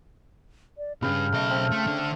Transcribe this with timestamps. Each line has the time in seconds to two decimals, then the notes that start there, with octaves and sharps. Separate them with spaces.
0.78 D5
1.02 C2 G2 C#3 B4 G5 A5 F6
1.32 B1 A3 B4 D#5
1.50 C4
1.71 A3
1.87 D3